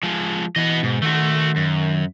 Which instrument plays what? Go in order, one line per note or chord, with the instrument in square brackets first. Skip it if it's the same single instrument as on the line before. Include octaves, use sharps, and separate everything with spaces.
[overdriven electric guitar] F3 G#3
[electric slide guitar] E3 [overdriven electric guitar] B3 D#5
[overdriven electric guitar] G#2 [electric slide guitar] B2
[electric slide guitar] D#3 F#5 [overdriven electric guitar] A3 F#4
[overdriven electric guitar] F#2